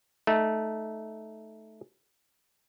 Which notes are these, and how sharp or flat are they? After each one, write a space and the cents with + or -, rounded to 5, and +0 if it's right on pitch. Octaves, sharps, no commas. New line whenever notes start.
A3 -10 D#4 +0